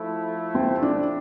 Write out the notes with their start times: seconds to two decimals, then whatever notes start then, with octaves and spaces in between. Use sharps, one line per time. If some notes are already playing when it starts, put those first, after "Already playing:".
Already playing: F3 A3 E4
0.55 C4
0.83 D4